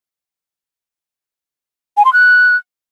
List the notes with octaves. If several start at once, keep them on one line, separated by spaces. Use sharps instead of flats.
G#5
C6
F#6